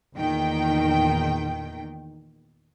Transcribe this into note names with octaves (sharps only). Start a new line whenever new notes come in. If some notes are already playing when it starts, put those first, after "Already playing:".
E2 A#2 D#3 G5